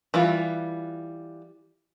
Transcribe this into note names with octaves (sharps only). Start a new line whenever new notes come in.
E3 G3 F4